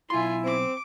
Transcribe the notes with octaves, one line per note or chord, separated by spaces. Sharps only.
B1 E4 F4 G#5 C6
C4 D6